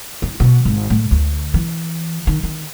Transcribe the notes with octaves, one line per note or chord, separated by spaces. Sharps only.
E4
B2
G#1
A2
D2
E3
D#3
D#3